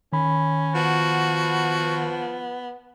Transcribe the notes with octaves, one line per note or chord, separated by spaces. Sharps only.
D#3 C#4 B5
F3 B3 F#4